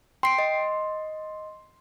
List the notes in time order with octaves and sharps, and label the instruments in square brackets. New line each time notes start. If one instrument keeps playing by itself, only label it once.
[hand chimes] G5 C7 D7 [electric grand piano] C6
[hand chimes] D#5